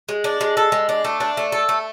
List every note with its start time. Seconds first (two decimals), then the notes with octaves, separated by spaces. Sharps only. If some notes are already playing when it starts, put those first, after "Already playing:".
0.09 G#3
0.24 D4
0.41 G#3
0.57 A4
0.72 G#3
0.89 D4
1.05 A3
1.20 D4
1.37 A3
1.52 A4
1.69 A3